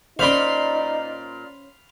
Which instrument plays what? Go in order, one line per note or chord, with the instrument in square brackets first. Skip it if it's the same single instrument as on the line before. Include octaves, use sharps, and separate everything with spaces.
[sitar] A#2 D5 [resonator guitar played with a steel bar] C#4 C5 [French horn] D#4 [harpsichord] F5 B5 C6